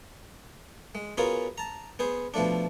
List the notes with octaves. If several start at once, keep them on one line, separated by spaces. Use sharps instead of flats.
G#3
B3 C#4 F4 F#4 G#4 A#4
A5 A#5
B3 G#4 C5
B2 F3 A3 D4